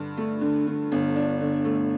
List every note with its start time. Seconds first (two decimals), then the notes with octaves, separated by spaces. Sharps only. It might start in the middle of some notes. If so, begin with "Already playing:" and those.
Already playing: G2 D3
0.17 A3
0.41 D3
0.67 D3
0.92 G1
1.16 D4
1.41 D3
1.65 A3